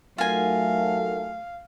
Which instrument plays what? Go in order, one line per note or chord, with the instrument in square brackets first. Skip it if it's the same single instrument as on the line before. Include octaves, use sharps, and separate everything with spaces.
[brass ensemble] F#3 A3 [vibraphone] D#4 A#4 F#5 [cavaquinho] F4 G#5 [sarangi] F5